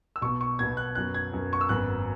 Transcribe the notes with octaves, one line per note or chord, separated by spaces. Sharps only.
E6
B1 B2 B3 C#6
C#6
B1 B2 B3 G#6
F#6
F#2 F#3 B3 F#6
G#6
F#2 F#3 B3
C#6
E6
G#1 F#2 F#3 B3 F#6